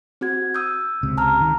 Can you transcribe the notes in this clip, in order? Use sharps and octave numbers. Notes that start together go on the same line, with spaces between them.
C4 F#4 G#6
D#6 E6 G6
C#2 C3
A5 A#5 F6
D#3